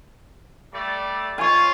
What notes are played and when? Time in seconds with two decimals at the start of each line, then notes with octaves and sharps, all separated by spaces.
0.73 G3 A3 D5
1.38 F4 C#5 G#5